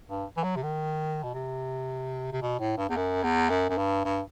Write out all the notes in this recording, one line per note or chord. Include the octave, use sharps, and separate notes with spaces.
G2
E3
F#3
C3
D#3
B2
C3
C3
B2
A2
G2
E2
F#2
E2
F#2
F#2
G2
G2